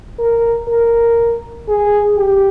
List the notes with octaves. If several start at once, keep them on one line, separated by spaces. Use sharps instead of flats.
A#4
A#4
G#4
G4